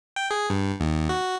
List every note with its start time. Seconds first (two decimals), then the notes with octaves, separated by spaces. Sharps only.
0.16 G5
0.31 G#4
0.50 G2
0.80 D#2
1.09 F#4